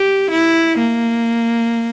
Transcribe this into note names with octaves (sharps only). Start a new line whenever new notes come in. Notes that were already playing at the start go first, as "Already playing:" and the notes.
Already playing: G4
E4
A#3